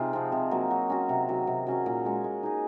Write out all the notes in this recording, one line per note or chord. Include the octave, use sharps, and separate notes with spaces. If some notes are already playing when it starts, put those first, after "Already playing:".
Already playing: C3 D#4 F4 G#4
F3 C4
C3
F#3 A#3
F#3
C#4 F#4
C3
D#3 F#3
C3
F#3 C#4 F#4
A#2
G#3 C#4
G#3
D#4 G#4